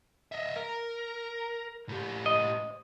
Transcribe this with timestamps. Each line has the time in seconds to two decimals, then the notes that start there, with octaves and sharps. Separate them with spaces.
0.32 D#5 E5
0.56 A#4
1.89 A2 G4
2.26 D#5